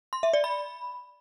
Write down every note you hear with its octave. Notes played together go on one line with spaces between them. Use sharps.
C6
E5
D5
B5